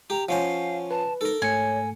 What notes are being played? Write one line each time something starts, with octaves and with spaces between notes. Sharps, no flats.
G4 A#5
F3 C#4 C5 F5 F#5
B4 A5
D#4 A4 A#4
G#2 A3 C#5 G#5 C#7